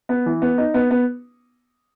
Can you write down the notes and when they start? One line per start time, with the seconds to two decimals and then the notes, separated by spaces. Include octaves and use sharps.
0.09 B3
0.26 E3
0.42 B3
0.58 D#4
0.74 B3
0.90 B3